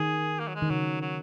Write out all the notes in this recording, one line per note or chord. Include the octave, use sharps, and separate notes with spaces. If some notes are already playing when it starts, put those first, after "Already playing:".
Already playing: D#3 G#4
A#3
F#3
G#3
D#3
C#3 F#3
F#3